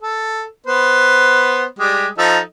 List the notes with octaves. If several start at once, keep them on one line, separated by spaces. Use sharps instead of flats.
A4
B3 B4 C5
G3 G#3 G4
F3 D#4 A4